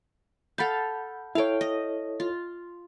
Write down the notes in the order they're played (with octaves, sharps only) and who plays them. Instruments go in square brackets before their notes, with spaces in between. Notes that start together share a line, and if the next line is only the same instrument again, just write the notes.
[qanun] A4 F5 [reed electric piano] F#5 B5 G6
[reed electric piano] E4 A4 C#5 [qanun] F5 G5
[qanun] D#5
F4